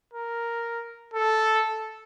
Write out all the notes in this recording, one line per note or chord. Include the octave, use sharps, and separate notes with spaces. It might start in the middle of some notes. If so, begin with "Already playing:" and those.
A#4
A4